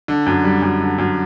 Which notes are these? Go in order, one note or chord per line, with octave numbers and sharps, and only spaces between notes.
D3
F#2
G3
F#2
D3
F#2